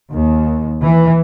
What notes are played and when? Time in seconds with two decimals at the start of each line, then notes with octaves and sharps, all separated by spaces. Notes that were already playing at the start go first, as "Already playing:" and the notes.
0.13 D#2
0.84 E3